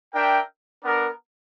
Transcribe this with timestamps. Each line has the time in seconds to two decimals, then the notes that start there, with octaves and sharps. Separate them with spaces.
0.13 D4 A#4 E5 G5
0.84 B3 D4 A#4